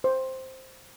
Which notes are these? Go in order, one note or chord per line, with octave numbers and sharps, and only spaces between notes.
C5